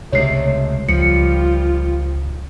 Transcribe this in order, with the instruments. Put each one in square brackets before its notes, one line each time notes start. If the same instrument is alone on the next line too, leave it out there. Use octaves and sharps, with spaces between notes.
[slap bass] C#2 C3 G#3 [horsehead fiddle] A3 [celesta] C#5 C7
[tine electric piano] C#2 [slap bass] F3 [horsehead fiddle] G3 F4 [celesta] C#7